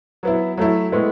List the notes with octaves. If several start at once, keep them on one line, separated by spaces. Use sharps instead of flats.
F#3 B3 E4
F#3 A3 E4
A2 G#3 B3 E4